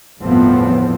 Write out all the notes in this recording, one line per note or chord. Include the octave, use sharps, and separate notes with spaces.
G1 E2 A2 F3 B3 C4